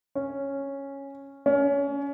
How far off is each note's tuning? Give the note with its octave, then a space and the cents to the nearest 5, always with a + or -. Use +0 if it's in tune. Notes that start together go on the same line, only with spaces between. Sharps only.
C#4 -5
C#4 +25